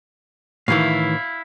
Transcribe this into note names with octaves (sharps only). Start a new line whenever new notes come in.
A2 D#3 E3 E4 F5